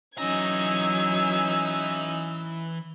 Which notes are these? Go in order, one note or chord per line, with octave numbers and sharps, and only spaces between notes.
E3 F#3 C#4 D#4 A#5 E6 G#6